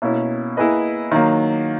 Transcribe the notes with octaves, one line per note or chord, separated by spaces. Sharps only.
B2 A#3 C#4 E4
A#3 E4 G#4 B4 D#5
D#3 F#3 A#3